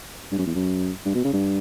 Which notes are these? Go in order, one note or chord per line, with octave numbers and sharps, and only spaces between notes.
G2
F#2
E2
F#2
G2
B2
C#3
G2